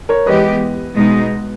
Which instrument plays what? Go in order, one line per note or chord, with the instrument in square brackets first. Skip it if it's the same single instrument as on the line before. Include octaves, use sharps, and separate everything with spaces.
[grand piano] A#4 C#5
[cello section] E3 G#3 B3 G4 [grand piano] B4 D#5
[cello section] B2 G#3 D#4